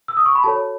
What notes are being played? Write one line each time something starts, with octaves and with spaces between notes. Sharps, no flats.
E6
D#6
C#6
B5
F#4 A4 C#5 A5